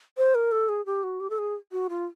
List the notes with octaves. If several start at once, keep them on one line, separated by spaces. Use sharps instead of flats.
C5
A#4
A4
G#4
G4
F#4
G4
A4
G#4
F#4
F4